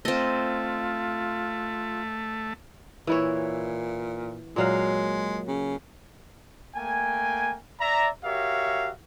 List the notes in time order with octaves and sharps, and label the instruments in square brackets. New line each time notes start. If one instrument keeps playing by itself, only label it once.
[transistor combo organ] A3 [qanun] C4 D#5 [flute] F4
[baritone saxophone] A#2 [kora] E3 E4 C#5
[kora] A#2 F#3 F5 [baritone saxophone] G#3
[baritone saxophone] C#3
[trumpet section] A3 A#3 G5 G#5
D5 E5 A#5
F#4 G4 A#4 C#5 E5 F5